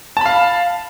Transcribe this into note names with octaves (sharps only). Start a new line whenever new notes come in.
F5 A5 B5